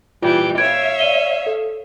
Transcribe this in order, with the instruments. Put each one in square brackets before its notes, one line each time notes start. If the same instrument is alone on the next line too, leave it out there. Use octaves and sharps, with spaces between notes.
[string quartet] A#2 E3 G3 [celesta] F4
[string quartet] C#5 E5 F5 [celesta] G#6 D7
[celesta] D5 D#7 G7
A4